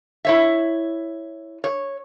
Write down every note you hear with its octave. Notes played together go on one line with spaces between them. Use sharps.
E4 C#5 E5
C#5